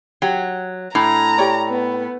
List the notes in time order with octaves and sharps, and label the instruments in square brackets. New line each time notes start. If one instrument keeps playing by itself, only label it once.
[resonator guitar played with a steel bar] F#3 [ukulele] G4 F#5
[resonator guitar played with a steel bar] A2 [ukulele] D4 [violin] A#5
[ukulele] G4 C#5 D5
[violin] B3